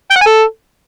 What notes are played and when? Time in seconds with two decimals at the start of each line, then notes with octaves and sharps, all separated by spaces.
0.11 G5
0.16 F#5
0.21 G#5
0.26 A4